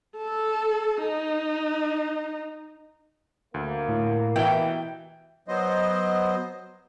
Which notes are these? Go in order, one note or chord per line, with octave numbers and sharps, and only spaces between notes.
A4
D#4
D2 A#3
A2
B2 E3 E4 G4 G5 G6
F#3 B3 C5 D#5